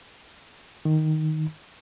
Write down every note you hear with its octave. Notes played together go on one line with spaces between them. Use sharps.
D#3